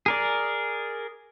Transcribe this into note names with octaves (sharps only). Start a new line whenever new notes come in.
G#4 A#4 D5